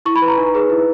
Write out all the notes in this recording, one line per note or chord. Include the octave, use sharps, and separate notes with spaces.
E4 C#6
B5
B4
A#5
D#4
G#4 B4
E4